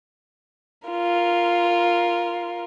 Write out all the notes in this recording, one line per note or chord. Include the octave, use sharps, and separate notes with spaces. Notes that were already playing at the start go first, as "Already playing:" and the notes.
F4 A#4